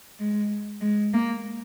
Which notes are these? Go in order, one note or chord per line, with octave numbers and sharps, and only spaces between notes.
G#3
G#3
A#3